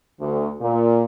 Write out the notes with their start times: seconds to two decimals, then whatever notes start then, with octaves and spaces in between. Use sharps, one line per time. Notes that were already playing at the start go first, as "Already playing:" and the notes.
0.20 D2
0.61 A#2